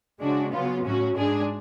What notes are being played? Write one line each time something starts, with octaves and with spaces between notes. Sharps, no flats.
C#3 G#3 D4 F#4
C#3 F#3 B3 F4
A2 F#3 C#4 F#4
G#2 G#3 D4 G#4